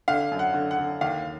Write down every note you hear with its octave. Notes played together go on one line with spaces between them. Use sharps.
D3 F5
F#2
F#5
D3
F#5
D3
D#2 F5